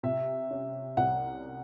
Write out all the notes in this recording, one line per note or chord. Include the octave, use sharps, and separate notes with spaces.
C3 E5
C#4
C2 F#5